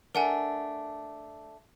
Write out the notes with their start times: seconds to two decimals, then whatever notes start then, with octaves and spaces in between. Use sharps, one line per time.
0.15 A3 D4 A#4 F#5 G#5